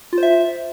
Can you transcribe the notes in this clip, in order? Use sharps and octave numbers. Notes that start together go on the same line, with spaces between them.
F4
C5
E5